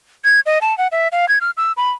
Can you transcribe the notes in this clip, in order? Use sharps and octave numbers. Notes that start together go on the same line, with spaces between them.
G#6
D#5
A5
F#5
E5
F5
G#6
F6
E6
B5